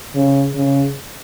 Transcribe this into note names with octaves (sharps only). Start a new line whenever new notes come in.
C#3
C#3